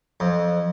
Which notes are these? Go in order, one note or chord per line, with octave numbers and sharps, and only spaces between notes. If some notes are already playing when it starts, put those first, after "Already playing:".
F2